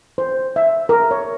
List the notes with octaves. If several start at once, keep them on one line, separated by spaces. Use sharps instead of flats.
C5
E5
A#4
C#5